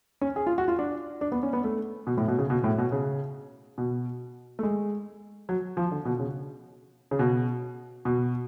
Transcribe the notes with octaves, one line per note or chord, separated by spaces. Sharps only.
C#4
G#4
F4
F#4
F4
D4
D4
B3
C#4
B3
A3
B2
A2
B2
C#3
B2
A2
B2
C#3
B2
A3
G#3
F#3
F3
D3
B2
C#3
C#3
B2
B2